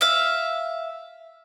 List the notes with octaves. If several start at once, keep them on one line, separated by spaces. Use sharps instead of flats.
E5 F5